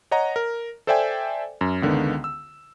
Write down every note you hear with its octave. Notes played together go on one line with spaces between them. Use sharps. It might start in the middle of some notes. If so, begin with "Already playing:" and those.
C#5 D#5 F#5 A#5
A#4
A4 C5 D5 E5 G5 G#5
F#2
C#2 D3 D#3 B3
E6